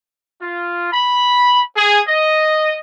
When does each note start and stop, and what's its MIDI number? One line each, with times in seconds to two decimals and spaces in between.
0.42 0.90 65
0.93 1.63 83
1.76 2.01 68
2.08 2.78 75